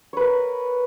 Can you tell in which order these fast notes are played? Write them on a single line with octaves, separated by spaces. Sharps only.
C#5 B4 A#4